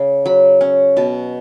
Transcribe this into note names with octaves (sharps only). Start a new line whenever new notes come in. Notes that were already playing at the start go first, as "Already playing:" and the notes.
Already playing: C#3
F#3 B5
C#4
B2 A5